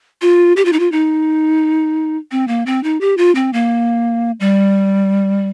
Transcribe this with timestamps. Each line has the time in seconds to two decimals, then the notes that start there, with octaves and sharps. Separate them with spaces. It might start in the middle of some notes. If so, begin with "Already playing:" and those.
0.22 F4
0.57 G4
0.65 F4
0.73 D#4
0.79 F4
0.92 D#4
2.31 C4
2.48 A#3
2.66 C4
2.84 D#4
3.01 G4
3.17 F4
3.35 C4
3.53 A#3
4.40 G3